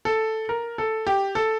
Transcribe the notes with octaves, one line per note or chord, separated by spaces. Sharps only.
A4
A#4
A4
G4
A4